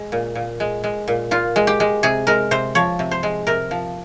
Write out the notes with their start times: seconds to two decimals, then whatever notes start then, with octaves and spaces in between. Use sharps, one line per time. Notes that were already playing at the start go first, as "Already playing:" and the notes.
Already playing: G#3
0.12 A#2
0.35 A#2
0.60 G#3
0.84 G#3
1.08 A#2
1.31 A#2 F4
1.56 G#3
1.67 G4
1.80 G#3
2.03 C3 G#4
2.27 G#3 A#4
2.51 C3 C5
2.75 F3 C#5
2.99 C3
3.11 C5
3.23 G#3
3.47 C3 A#4
3.71 F3